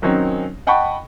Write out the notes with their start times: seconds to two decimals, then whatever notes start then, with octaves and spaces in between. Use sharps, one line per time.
0.02 D#3 F#3 C4 C#4 D#4
0.67 D#5 F#5 G5 A5 B5 C#6